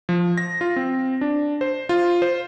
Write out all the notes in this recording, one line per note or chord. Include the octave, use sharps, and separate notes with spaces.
F3
A#6
F4
C4
D4
C5
F4
C5